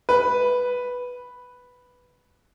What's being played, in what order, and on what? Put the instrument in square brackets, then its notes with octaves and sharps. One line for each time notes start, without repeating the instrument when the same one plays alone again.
[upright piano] B4